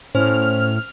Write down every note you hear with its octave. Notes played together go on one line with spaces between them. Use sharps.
A2 C#4 C5 F6